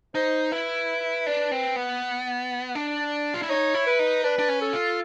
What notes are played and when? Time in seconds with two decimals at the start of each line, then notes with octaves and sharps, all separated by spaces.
0.15 D#4 C5
0.52 E4 B4
1.26 D4
1.52 C4
1.76 B3
2.75 D4
3.34 F4
3.42 E4
3.49 D#4 C#5
3.74 E4
3.87 B4
3.99 D#4
4.24 D4 B4
4.39 D4
4.49 C#4
4.61 A4
4.73 F4